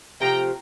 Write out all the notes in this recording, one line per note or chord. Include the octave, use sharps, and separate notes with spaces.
C3 F3 A3 G5 A#5